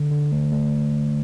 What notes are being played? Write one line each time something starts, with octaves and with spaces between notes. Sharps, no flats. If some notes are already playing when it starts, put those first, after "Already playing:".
Already playing: D3
D3
A3
A3